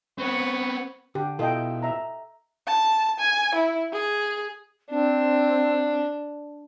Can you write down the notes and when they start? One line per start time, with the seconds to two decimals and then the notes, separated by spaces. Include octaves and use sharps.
0.18 B3 C4 B4 C#5 F#5
1.15 D3 G4
1.39 B2 E4 F4 A4 D#5 G5
1.83 E5 A#5
2.67 A5
3.20 G#5
3.55 E4
3.93 G#4
4.91 C4 D4